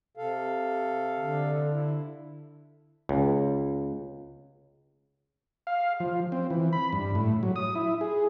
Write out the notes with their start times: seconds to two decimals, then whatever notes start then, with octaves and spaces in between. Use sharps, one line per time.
0.17 C3 A4 F5
1.19 D3
1.71 E4
3.09 C#2
5.67 F5
6.00 F3
6.32 C4
6.50 E3
6.73 B5
6.93 G2
7.15 A2
7.43 F#3
7.56 D#6
7.75 E4
8.01 G#4